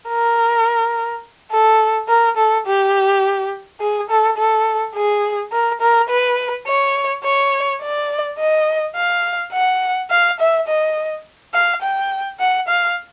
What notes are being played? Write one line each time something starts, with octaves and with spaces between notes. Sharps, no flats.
A#4
A4
A#4
A4
G4
G#4
A4
A4
G#4
A#4
A#4
B4
C#5
C#5
D5
D#5
F5
F#5
F5
E5
D#5
F5
G5
F#5
F5